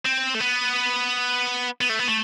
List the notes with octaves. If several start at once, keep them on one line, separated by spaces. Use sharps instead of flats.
C4
A3
B3
B3
A3
B3
A3